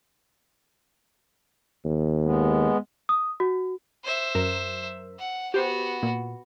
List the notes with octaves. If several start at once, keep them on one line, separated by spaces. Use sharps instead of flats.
D#2
G#3 B3
D#6
F#4
C5 E5
F#2 A#4
F#5
B3 F#4 G4 C5
A#2